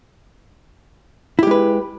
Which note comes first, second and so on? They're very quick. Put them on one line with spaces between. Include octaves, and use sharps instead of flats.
E4 G4 G#3 B4